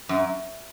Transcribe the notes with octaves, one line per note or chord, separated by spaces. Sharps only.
F#2